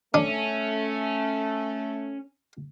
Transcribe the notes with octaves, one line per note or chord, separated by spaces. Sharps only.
A3 C#4 D4